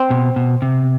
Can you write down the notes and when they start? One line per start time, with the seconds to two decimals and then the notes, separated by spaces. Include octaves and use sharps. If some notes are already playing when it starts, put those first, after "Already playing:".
Already playing: C4
0.10 B2
0.36 B2
0.62 C3